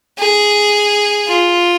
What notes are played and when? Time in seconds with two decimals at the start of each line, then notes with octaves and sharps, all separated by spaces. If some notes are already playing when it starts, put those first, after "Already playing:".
0.19 G#4
1.28 F4